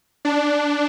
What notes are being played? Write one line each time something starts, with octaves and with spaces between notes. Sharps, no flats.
D4